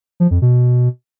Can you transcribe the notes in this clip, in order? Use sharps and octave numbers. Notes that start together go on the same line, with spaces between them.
F3
F2
B2